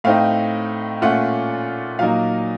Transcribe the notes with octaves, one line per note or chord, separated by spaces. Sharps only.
A2 A3 C4 D#4 F5
A#2 A3 C#4 F4 F#5
A#2 F#3 A#3 D#4 F5